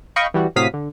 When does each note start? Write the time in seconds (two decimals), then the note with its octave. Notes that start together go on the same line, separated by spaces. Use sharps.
0.16 D#5 F5 G5 B5 C#6
0.34 E3 G3 F#4
0.56 A2 C3 F#3 F5 D#6 B6
0.74 D3